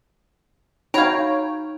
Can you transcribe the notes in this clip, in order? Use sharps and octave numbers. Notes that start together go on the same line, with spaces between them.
F#3 D#4 C#5 F5 G5 A#5